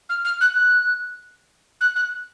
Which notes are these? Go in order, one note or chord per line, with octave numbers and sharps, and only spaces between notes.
F6
F6
F#6
F#6
F#6
F#6